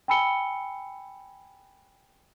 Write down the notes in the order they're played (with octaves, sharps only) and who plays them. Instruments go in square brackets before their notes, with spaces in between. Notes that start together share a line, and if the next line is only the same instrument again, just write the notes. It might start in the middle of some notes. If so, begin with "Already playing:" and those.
[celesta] G5 G#5 B5 E6 C#7 G7